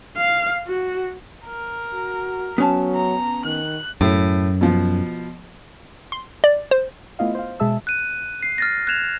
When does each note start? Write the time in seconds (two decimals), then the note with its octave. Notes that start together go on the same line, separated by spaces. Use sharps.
0.17 F5
0.68 F#4
1.46 A#4
1.93 F#4
2.58 F#3 B3 C#4 A5
2.95 A#5
3.45 D#3 F#6
4.01 F#2 A2
4.61 B2 F3
6.12 C6
6.44 D5
6.71 C5
7.19 A3 B3 E4 F4 D#5 F5
7.35 C5 F5
7.60 B2 G#3 G#4 E5 A5 E6
7.87 F#6 D#7
8.43 C7
8.58 F6 A6 A#6
8.87 F#6 G#6 E7 F7